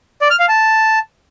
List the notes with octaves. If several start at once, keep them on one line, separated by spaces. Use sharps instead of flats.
D5
F6
F5
A5